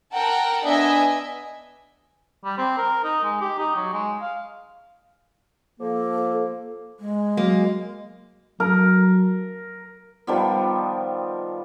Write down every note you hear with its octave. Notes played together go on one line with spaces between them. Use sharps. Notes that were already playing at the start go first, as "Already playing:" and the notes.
A#4 F#5 G5 A5
B3 D4 D#5 E5 G#5
G3
C4
A#4
D#4
G#3
G4
D#4
F#3
G#3
F5
F3 A#3 A4
G#3
F#3 A#3
F#3 A#4
D#3 F3 G3 B3